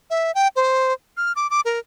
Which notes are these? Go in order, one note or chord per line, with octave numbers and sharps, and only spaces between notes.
E5
G5
C5
F6
D6
D6
A#4